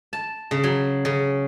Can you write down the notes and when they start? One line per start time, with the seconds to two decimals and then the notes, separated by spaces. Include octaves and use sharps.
0.13 A5
0.51 C#3
0.64 F#3
1.05 C#3